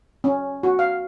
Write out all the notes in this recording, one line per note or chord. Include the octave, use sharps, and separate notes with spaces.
C#4
F#4
F5